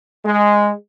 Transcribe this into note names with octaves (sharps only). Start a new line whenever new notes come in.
G#3